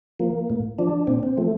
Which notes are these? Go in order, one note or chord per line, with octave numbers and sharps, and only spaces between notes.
F3 A#3
A2
F3 D4
A#2 C4
C4
F3 A3